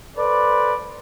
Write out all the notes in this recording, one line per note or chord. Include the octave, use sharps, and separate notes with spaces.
A4 B4 C5 D5